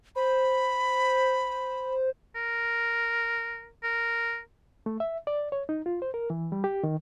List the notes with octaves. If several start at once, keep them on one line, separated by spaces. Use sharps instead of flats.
C5 B5
A#4
A#4
A3
E5
D5
C#5
D#4
F4
C5
A#4
E3
G3
G4
D#3